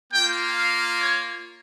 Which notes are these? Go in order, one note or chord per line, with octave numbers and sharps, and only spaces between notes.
A#3 F4 G5
F5
C#5